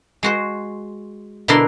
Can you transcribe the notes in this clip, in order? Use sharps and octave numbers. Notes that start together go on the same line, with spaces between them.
G#3 F#4 C5
B2 D3 D4 E4 A#4 C6